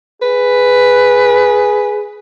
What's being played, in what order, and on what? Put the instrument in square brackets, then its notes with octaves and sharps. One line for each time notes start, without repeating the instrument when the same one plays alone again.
[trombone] G#4 [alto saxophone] B4